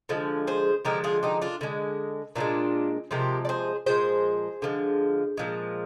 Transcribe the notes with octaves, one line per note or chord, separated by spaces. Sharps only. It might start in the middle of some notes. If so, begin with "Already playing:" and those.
D3 F3 G#3
G#4 C5
D3 F3 G#3 G4 A#4
F4 G#4
D#4 G4
D4 F4
D3 G#3
A#2 F3 G#3 D4 F4
C3 F3 G#3 G4 A#4
D5
G#4 C5
A#2 F3 G#3 G#4 C5
D3 F3 G#3
A#2 F3 G#3